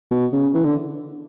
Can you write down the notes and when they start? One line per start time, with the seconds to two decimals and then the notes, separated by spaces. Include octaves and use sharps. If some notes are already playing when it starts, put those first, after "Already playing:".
0.11 B2
0.32 C#3
0.54 E3
0.64 D3